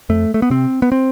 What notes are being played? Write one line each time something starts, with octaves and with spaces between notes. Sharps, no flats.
F2 A3
A3
B3
C3 C4
B3
C4